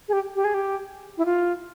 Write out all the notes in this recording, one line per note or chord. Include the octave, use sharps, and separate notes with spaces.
G#4
G4
G4
G#4
G4
E4
F4